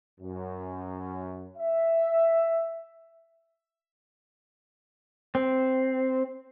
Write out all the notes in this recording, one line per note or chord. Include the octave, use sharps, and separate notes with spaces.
F#2
E5
C4